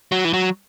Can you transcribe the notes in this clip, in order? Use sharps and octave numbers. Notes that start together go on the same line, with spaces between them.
F#3
E3
F#3